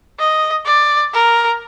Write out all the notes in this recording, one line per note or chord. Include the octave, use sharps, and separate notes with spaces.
D#5
D5
A#4